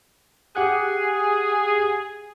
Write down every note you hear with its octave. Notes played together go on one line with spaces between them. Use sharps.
G4 G#4 F#5 F#6